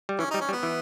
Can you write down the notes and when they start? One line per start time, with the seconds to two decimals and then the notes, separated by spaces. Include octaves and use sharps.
0.09 G3
0.19 E3 C#4
0.31 G3 D#4
0.41 C#4
0.49 G3
0.52 B3
0.63 E3